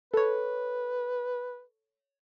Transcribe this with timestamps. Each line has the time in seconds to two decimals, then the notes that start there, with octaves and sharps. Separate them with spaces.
0.14 A4 B4 C#5